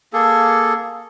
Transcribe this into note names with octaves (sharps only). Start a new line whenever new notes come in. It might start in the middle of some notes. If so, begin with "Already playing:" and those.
A#3 G#4 A4